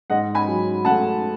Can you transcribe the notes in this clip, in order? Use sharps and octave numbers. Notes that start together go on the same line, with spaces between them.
G#2 D#5 F#5
G#5 B5
F#3
A3 F#5 A5